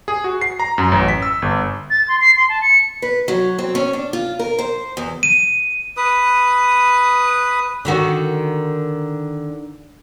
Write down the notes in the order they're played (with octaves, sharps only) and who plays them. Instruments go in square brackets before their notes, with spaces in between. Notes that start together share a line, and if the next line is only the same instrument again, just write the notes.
[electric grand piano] G#4
F#4
C7
A#5
F#2
A1
B6
E6
G1
[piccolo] A6
C6
C7
C6
A5
C#7
[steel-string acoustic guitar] B4
F#3
C4
C#4
D4
F4
A#4
C5
E2
[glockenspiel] D#7
[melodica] B4 D#6
[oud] D3 D#3 F#4